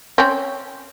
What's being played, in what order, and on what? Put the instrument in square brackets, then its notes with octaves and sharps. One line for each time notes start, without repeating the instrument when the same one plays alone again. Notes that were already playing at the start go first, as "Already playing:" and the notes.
[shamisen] C4 C#4